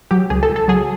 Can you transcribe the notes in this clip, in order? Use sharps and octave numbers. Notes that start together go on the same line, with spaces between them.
F#3 G4
C#2 G#4
A4
C#2
A4
F#3 G#4